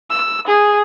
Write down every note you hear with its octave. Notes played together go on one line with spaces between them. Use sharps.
E6
G#4